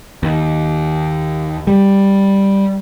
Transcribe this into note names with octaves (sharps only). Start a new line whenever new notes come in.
D#2
G3